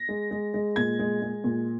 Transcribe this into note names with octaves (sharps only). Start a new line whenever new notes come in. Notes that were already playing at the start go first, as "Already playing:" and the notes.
Already playing: A#6
G#3
G#3
G#3
A#2 G#6
G#3
G#3
A#2